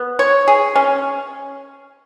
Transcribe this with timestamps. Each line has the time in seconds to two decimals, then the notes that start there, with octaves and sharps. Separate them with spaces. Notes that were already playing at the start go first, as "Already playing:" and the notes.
Already playing: B3
0.19 C#5
0.48 G#4
0.76 C#4